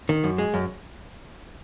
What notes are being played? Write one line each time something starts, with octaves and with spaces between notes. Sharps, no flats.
D#3
F#2
G#3
F#2